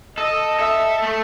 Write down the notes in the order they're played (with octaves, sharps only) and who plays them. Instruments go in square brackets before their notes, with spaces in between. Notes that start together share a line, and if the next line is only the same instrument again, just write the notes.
[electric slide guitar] A4 [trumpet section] D#5
[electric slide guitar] A4 [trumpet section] E5
[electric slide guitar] A3